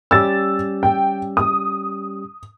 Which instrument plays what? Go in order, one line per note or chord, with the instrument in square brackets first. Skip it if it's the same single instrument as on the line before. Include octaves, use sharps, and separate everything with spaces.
[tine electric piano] G3 C#4 G4 [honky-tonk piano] E6 A6
[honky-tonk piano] G5
D#6